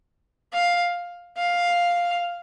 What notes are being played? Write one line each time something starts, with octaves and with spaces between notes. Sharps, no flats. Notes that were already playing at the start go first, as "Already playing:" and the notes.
F5
F5